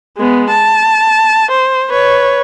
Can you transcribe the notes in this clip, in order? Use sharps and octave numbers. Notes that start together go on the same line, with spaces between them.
G#3 B3
A5
C5
B4 C#5